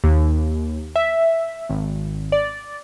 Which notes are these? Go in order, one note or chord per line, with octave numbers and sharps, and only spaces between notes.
D#2
E5
G#1
D5